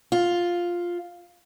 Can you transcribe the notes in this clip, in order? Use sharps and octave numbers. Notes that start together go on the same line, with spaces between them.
F4